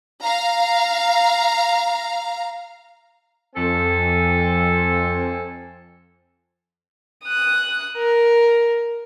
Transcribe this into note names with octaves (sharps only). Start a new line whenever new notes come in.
F5 A#5
F2 C4 A4 G#5
D#6 F#6
A#4